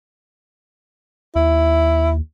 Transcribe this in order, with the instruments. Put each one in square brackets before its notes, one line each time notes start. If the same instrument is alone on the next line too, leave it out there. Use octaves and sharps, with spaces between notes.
[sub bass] D#2 [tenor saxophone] E4